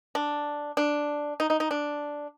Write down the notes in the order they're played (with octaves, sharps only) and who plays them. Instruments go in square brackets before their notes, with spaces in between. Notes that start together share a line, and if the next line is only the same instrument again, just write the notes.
[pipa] D4
D4
D#4
D#4
D#4
D4